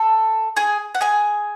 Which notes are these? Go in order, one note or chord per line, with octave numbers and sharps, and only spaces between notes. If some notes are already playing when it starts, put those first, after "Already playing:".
Already playing: A4 A5
G#4 G#5
F#5
G#4 G#5